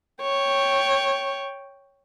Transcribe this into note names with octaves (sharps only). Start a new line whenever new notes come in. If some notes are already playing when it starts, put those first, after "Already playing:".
C#5 G5